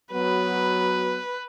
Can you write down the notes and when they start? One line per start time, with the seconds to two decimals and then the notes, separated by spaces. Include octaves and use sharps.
0.12 F#3 B3 F#4 B4